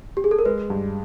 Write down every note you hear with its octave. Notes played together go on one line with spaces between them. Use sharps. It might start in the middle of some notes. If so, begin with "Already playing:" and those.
G4
G#4
A4
A#4
G#3 B4
G2